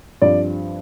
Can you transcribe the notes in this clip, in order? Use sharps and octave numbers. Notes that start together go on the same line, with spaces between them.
G2 F3 C4 D5